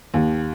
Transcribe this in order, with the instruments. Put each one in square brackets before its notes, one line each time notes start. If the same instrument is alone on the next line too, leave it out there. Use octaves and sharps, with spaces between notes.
[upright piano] D#2